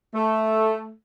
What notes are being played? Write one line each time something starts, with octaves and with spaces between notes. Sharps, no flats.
A3